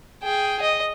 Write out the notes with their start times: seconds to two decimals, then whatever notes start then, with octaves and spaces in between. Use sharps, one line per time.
0.22 G#4 G5
0.61 D#5